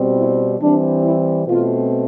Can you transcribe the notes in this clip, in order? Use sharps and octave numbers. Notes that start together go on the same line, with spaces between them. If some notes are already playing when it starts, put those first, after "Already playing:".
Already playing: B2 G3 C4
E4
E3 G3 C4 D4
E4
B2 A3 C4 F4